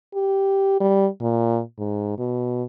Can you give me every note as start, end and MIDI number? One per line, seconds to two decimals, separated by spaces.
0.15 0.80 67
0.80 1.07 55
1.20 1.60 46
1.79 2.15 44
2.18 2.64 47